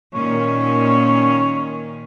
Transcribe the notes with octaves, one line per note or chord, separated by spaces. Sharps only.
A#2 D#3 C#4 C#5